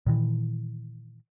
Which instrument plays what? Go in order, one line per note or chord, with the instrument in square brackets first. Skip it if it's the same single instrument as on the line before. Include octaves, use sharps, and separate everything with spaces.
[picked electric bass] A#2 D#3 E3